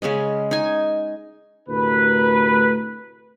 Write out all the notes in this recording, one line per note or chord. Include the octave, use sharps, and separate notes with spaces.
C#3 G#3 C#4 D#5
D#4 G#5
D2 A2 C3 A#4 B4